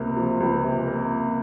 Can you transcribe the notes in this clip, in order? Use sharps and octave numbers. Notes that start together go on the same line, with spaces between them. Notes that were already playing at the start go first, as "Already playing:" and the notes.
Already playing: C#2 C3 A#3
F3
C#2
C3
A#3